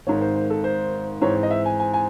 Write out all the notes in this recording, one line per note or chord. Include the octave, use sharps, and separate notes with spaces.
G#1 G#2 D#3 C#5
C5
C5
A4
C5
G#2 E3 C4 C#5
D#5
E5
G#5
G#5
G#5